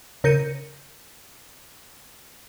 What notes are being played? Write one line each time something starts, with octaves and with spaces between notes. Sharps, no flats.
C#3 A#4 G6 C#7 D#7